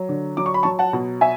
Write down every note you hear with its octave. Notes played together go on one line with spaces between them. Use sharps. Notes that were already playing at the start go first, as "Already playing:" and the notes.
Already playing: F#3
D3
F#3 D6
C#6
B5
F#3 A5 C#6
F#5 A5
B2
E5 G#5